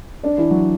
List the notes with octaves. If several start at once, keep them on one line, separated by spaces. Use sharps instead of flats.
D4 D5
E3 E4
F#3 F#4